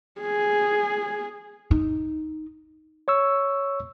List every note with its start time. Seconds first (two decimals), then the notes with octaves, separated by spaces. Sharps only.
0.21 G#4
1.71 D#4
3.08 C#5 C#6 E6